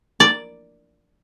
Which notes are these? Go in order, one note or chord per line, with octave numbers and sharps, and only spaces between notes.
D5